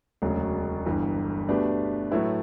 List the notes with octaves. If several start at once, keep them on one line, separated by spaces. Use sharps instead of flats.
E1 D2 C#3 F#3
G1 G2 E3
B2 A3 D4 G4 B4
A2 F#3 A3 E4 B4